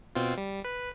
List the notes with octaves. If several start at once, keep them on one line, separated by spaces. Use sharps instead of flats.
B2 C4 F4
G3
B4